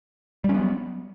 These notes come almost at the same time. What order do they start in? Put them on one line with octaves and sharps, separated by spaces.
G3 C#4 B3 F#3